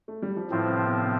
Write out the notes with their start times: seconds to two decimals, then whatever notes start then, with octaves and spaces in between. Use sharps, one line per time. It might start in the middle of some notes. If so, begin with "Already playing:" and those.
0.08 A3
0.22 G3
0.36 F3
0.51 A2 E3 F3 C4
0.68 C3
0.85 B2
1.04 C3